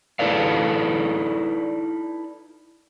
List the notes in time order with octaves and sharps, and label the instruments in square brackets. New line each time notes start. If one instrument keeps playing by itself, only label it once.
[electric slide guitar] D#4 E4 A4 B4 D5 F5